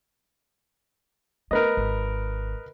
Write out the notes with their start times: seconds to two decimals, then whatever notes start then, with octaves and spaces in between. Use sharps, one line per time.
1.51 A3 A#4 B4 D#5
1.77 G#1